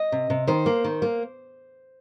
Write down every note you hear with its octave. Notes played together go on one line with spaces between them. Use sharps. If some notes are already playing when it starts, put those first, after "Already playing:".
Already playing: D#5
C3
C3
D#3 C5
A#3
D#3
A#3